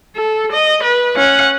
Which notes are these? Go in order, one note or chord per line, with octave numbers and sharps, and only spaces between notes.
A4
D#5
B4
C#4 F#5